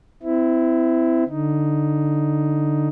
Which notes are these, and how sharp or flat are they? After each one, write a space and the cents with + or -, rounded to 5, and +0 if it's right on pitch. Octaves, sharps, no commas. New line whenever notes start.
C4 -30 E4 +0
D3 +0 D#4 +5